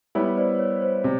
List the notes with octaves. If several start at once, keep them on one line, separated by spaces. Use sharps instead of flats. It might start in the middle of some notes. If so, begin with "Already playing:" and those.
G3 B3 E4 G4 B4 C#5
C5 D5
C#5
C5
C3